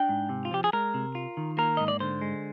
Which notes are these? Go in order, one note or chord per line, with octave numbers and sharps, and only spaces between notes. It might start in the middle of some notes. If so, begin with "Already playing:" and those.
Already playing: D4 G5
G#2
C3
F4
F3 G4
G#4
G#3 A#4
C3
F4
D#3
A#3 A#4
G#2 D#5
D5
D3 C5
G#3